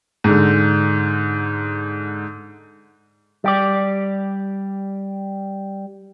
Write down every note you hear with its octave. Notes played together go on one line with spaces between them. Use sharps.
G#2 D3
G3 G4 D5